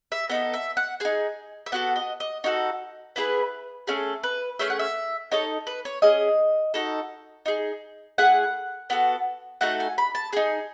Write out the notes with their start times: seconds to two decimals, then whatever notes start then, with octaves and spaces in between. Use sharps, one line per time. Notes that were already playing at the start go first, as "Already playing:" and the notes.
0.12 E5
0.30 B3 D#4 A4 D#5
0.54 E5
0.77 F#5
1.00 D#4 G#4 G#5
1.66 E5
1.72 B3 F#4 A4 F#5
1.96 D#5
2.20 D#5
2.44 D#4 F#4 A4 C#5
3.16 B3 E4 G#4 B4
3.87 A3 C#4 G#4 A4
4.24 B4
4.59 A3 C#4 G#4 E5
4.70 F#5
4.79 E5
5.32 D#4 A4 C#5
5.67 B4
5.85 C#5
6.02 C#4 G#4 D#5
6.74 D#4 F#4 A4
7.46 D#4 G#4
8.18 A3 E4 G#4 F#5
8.90 B3 F#4 A4
9.61 A3 D#4 F#4 A4 F#5
9.80 G#5
9.98 B5
10.15 A5
10.33 D#4 G#4 G#5